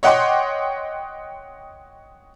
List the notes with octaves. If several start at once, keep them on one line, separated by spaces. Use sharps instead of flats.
C#5 D#5 F#5 G5 C6 D6